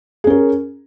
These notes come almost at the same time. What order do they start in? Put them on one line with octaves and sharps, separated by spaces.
G#4 C#4 A#4